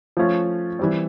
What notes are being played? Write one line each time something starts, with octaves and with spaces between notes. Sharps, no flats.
F3 A3 C#4 F4
E3 G3 C4